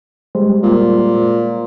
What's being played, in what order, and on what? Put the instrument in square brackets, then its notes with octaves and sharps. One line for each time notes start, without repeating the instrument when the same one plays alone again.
[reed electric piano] G3 G#3 C5
[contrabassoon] A#2